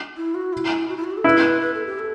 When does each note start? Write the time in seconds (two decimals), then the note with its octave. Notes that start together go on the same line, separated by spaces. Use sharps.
0.17 E4
0.35 F#4
0.53 E4
0.89 F#4
0.97 E4
1.04 F#4
1.11 G4
1.17 A4
1.24 E4 B4
1.61 B4
1.74 A4
1.86 G4
1.99 A4